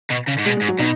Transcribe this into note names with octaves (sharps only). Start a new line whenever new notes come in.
B2
C#3
G#2
B2 G#3
G#3
G#2
F#3
B2 D#4